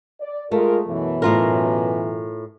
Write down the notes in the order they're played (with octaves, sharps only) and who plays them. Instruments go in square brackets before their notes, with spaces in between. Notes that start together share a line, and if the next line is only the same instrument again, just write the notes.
[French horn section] D5
[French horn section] G#3 F4 A#4 [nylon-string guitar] A3
[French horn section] F#2 B2 E3
[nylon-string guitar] A2 F4 A#4